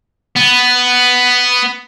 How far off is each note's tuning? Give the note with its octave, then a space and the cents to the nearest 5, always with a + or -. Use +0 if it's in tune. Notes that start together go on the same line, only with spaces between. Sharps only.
B3 +5